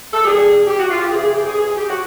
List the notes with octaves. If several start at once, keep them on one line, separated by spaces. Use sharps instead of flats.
A4
E2 B2 G3 G#4
G4
F#4
F4
G4
F#2 C#3 E3 G#4
G#4
G4
G#4
G#4
G#4
G4
F#4